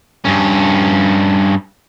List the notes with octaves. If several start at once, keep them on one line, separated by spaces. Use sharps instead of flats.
G2 C#4